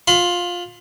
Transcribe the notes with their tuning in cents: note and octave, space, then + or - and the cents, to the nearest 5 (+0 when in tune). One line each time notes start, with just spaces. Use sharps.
F4 +15 B5 +40